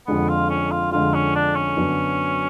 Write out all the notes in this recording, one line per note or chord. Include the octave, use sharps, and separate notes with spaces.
F2 D3 G#3 B3
F4
C#4
F4
F2 D3 G#3 F4
C#4
D4
C#4
F#2 D3 F#3 B3 D4